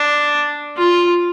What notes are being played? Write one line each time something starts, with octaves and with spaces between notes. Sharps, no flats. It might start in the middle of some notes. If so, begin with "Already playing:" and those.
Already playing: D4
F4